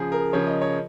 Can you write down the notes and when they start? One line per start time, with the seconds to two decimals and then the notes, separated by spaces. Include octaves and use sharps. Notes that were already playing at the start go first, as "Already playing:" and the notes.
Already playing: C#3 F3 G#4
0.12 A#4
0.33 C#3 F3 C#5
0.47 D#5
0.62 C#5